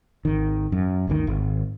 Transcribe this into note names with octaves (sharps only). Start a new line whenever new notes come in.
G#1 D#3
F#2
G1 D2 B2 D#3
G#1